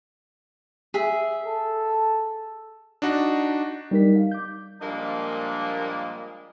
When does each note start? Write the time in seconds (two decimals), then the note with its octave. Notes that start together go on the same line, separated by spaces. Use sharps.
0.94 G#4 E5
1.46 A4
3.02 D4 D#4 F#4
3.91 G3 D#4 A#4 B6
4.16 F5
4.31 D6 G6
4.81 A#2 F3 G3 G#3 A#3 D4